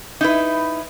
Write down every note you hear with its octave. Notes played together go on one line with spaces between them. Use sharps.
D#4 E4 B4